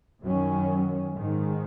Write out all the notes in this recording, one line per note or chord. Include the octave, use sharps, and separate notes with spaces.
F#2 D#3 F#3 C#4
G#2 D#3 G#3